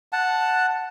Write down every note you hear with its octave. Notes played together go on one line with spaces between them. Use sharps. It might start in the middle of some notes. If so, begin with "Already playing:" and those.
F#5 A5